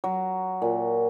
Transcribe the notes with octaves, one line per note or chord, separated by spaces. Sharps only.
F#3
A#2